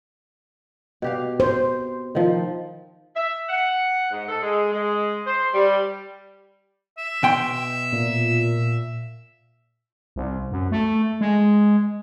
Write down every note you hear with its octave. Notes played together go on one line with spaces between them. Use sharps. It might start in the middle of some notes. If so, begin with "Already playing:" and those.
B2 G4 F5
C5
D#3 F3
E5
F#5
G#2
A4
G#3
G#3
C5
G3
E5
B2 G5 C6
A#2
C2
F#2
A3
G#3